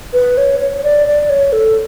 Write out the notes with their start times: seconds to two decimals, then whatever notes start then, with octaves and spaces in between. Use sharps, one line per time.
0.13 B4
0.38 C#5
0.60 C#5
0.77 C#5
0.84 D5
1.07 D5
1.30 C#5
1.53 A4